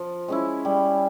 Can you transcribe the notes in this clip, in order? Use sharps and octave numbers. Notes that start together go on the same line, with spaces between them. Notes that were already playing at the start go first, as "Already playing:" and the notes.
Already playing: F3
G#3 C#4 E4
G3